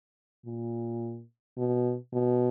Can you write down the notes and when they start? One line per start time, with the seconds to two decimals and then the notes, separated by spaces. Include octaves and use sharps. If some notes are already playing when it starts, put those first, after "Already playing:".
0.46 A#2
1.57 B2
2.13 B2